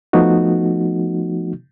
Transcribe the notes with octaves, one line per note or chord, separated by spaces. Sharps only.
F3 A3 B3 D#4 F#4